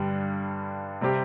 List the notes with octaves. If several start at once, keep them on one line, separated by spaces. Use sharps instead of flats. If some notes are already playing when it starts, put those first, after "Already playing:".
Already playing: G2 D3 G3
C3 G3 C4 G4